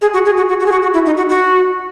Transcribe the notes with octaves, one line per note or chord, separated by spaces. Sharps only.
G#4
F#4
G#4
F#4
F#4
F#4
G#4
F#4
F#4
E4
D#4
F#4
F#4